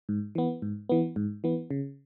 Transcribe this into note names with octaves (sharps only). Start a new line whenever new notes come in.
G#2
E3 B3
G#2
E3 B3
G#2
E3 B3
C#3